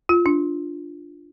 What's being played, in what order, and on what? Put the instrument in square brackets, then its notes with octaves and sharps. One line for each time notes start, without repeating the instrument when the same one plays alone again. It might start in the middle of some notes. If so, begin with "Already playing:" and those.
[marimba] F4
D4